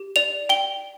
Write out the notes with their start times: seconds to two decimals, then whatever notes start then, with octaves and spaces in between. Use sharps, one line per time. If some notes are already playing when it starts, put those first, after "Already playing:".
Already playing: G4
0.16 D5 F7
0.49 G5 G7